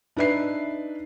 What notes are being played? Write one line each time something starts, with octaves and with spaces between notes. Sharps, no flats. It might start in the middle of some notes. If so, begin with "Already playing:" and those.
D4 D#4 B4 E5 C7